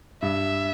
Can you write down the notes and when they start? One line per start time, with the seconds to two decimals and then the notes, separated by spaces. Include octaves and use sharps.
0.22 G2 E5